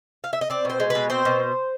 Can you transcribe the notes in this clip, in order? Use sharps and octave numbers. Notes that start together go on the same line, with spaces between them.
F5
E5
D#5
C4 D5
B2 C5
G#3
B2 B4
C4 C5
B2